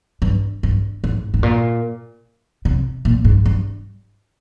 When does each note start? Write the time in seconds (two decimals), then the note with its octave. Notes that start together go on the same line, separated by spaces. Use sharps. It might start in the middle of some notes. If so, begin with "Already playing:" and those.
0.22 G2
0.63 G2
1.04 G#2
1.34 G#2
1.43 A#2
2.65 C3
3.05 A#2
3.25 G#2
3.46 G2